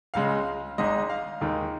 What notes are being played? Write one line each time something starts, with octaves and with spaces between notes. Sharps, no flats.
C#2 C#3 G#3 F5
G#1 G#2 G#3 D#5
F5
D#2 D#3 G#3